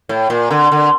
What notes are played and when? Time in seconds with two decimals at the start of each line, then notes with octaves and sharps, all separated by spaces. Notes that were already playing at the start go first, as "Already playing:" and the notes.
0.09 A2
0.30 A#2
0.51 D3
0.72 D3